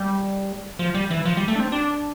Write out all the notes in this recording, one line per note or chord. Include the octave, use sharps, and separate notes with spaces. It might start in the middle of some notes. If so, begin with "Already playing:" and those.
Already playing: G3
F3
G3
E3
F3
G3
A3
D4
C4
D4